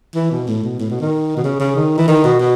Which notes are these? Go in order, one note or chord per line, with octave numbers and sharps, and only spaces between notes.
E3
B2
A2
B2
A2
B2
D#3
B2
C#3
C#3
D#3
E3
D#3
B2
B2